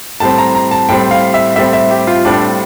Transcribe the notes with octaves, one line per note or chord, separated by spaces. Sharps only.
A2 G3 C4 A5
A#5
A#5
A5
A2 G3 C4 G5
F5
E5
A2 G3 C4 E5
E5
G4
F4
A2 G3 C4 D4